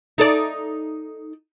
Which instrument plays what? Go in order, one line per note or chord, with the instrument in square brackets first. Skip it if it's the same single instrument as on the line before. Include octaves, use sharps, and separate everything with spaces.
[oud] D#4 A4 D5